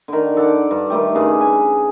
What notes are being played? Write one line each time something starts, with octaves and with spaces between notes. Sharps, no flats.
D3 D#3
A4 D5 F#5 A5
G2
D#3 G3 A3 G4
G2 C#3 G#4
B4 G#5